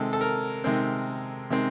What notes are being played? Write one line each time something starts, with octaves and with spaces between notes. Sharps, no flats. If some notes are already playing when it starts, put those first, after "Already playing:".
Already playing: C3 D#3 G#3 C4 A4
A4
A#4
C3 D#3 G#3 C4
C3 D#3 G#3 C4